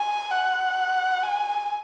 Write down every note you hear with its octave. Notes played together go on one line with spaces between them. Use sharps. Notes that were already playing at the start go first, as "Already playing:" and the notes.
Already playing: G#5
F#5
G#5